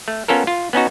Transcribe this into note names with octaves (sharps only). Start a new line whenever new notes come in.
A3
B3 C#4 F4 A4 A#4
F4
B3 C#4 D#4 F#4